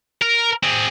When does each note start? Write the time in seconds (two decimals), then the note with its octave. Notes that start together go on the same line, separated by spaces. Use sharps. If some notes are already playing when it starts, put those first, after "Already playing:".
0.22 A#4
0.63 C4 G#4